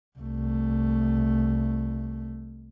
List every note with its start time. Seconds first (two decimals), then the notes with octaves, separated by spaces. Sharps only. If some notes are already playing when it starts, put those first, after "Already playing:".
0.19 C2 A3